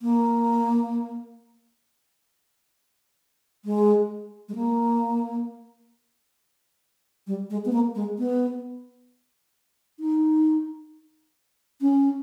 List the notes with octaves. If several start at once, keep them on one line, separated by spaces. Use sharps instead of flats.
A#3
G#3
G#3
A#3
G3
G#3
B3
A#3
G#3
B3
D#4
C#4